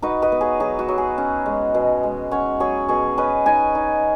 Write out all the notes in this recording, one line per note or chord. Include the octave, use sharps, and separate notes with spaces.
D#4 F#4 B4
B4 D#5
B3
G#4 C#5
F#3 G#4
F#4
F#3
G#4
C#4
G#3
B2
G#3
C#4 C#5 F#5
F#3 G#4 C#5
B2 G#4 C#5
C#4 B4 D#5
D#4 D#5 G#5
D#4